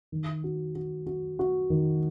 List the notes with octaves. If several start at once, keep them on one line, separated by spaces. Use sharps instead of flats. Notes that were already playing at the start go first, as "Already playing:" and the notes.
D#3
F#4
F#4
F#4
F#4
D#3